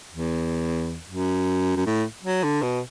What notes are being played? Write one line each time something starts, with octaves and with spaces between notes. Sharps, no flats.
E2
F#2
F#2
A2
F#3
D3
B2